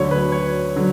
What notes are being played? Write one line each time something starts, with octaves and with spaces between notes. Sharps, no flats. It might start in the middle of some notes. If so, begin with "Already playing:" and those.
Already playing: D2 D3 F#3 C#5
B4
C#5
D3 F#3